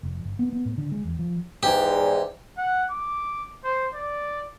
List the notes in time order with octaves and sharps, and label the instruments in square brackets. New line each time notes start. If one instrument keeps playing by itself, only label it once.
[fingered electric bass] F1
G1
B3
B3
A2
D3
G#3
E2
F3
[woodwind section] E2 G#2 [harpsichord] G4
[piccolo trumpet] F#5
D6
C5
D5